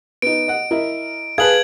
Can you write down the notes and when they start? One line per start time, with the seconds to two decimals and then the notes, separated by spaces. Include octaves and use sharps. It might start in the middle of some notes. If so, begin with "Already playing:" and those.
0.22 B3 D#4 D7
0.48 D#5 F#5
0.71 E4 A#4 D#5
1.38 G#4 B4 F5 A5 F#6 G#6 F#7